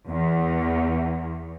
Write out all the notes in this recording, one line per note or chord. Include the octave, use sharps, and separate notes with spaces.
E2